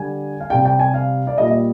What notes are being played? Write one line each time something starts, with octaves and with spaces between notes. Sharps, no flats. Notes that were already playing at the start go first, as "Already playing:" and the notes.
Already playing: D3 G3 G#5
F5
C3 G3 G5
G5
G#5
F5
D5
A#2 G3 D#5
D#5